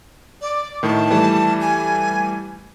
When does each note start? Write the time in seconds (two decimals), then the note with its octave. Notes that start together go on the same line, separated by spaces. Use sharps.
0.41 D5
0.83 A2 D#3 A5
1.10 E3 G3 A3
1.61 G#5